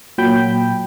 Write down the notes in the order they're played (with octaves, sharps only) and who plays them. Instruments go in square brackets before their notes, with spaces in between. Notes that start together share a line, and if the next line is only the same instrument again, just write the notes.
[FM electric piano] A#2 F#3 G5 B5 G6